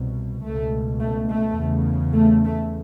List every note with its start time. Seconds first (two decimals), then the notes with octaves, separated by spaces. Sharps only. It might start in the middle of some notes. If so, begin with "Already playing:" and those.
Already playing: C2 B2
0.43 C#2 B2 A3
1.01 A3
1.30 A3
1.57 E2 C#3
2.14 A3
2.44 A3